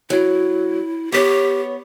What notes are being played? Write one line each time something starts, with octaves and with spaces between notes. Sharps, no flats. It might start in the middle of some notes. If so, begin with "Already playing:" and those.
F#3 E4
B3 G4 C#5